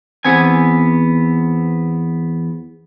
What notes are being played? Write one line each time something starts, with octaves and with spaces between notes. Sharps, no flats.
E2 B3 C4 G#5